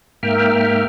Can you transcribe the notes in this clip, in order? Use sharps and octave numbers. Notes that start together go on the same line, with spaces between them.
G#2 A#3 A#4 E5 G5 F6